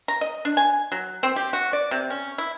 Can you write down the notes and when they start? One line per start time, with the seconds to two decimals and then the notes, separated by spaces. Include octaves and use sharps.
0.08 A#5
0.21 D#5
0.45 D4
0.57 G#5
0.92 F#3
1.23 C4
1.36 G4
1.53 F#4
1.73 D5
1.91 C3
2.10 C#4
2.38 E4